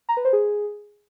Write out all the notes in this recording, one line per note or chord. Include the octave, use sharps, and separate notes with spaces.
A#5
B4
C5
G#4